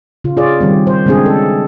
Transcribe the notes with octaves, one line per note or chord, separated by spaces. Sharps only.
C#3 F4
F4 G#4 C#5 D5
D#3 G3 C4
C5
C#3 G#3 C4 D4 G#4
A4